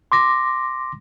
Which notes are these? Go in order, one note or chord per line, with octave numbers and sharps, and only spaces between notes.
C6 D6 A#6